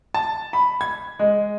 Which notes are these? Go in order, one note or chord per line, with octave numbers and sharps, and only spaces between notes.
A5
B5
G#6
G#3